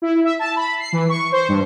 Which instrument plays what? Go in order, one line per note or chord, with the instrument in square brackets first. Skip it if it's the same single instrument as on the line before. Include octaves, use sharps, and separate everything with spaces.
[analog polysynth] E4
E5
A5
B5
C7
E3
C#6
C5
G2